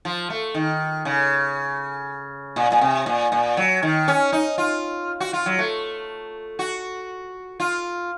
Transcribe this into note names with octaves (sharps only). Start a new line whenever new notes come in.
F3
A3
D#3
C#3
A#2
A#2
C3
A#2
A#2
F#3
D#3
C#4
D#4
F4
F#4
F4
F#3
A3
F#4
F4